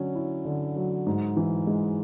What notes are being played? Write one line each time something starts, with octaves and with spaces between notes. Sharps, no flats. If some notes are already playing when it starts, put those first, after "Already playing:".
Already playing: D3 F#3 C#4
E4
D3
F#3
G#2
E3
G#3